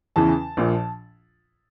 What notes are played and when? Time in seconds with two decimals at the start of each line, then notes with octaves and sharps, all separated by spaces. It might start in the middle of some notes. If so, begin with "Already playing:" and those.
0.16 E2 C#3 E3 A5
0.57 A#1 A#2 F3